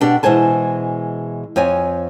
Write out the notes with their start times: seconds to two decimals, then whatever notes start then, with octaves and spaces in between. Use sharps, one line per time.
0.01 B2 D4 G4 F#5 G5
0.23 B2 E3 G#3 C5 G#5 A5
1.56 F2 C4 C#5 G#5